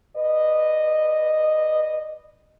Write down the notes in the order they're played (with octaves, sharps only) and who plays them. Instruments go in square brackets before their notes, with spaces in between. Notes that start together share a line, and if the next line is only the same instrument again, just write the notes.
[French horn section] B4 D5 D#5